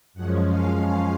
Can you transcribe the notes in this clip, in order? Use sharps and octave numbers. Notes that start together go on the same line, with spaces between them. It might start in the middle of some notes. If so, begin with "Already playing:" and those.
F#2 F3 G#3 C#4 F#5
F5
F5